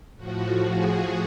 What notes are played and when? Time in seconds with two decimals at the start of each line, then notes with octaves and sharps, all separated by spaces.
0.17 A2 F3 F#4
0.67 G#4